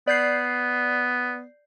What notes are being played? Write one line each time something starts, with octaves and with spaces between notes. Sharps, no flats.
B3 D5 G6 C7